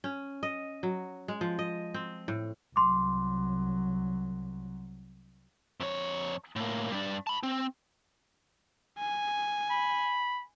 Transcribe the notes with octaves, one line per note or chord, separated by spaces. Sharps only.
C#4
D#5
F#3
G#3
F3
D#5
C4
A2
C2 F#3 C6 D6
F2 C#5
A2 A#3
G2 D4
A5 B5
C4
G#5
B5